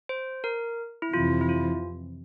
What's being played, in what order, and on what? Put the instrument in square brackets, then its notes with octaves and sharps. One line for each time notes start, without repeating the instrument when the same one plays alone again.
[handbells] C5
A#4
E4
[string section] F2 C3 E3 [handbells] F4
[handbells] E4
F4